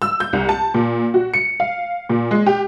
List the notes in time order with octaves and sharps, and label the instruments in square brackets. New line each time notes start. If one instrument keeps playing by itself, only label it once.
[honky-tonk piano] E6
G6
C2
A5
A#2
F#4
C#7
F5
A#2
G#3
G4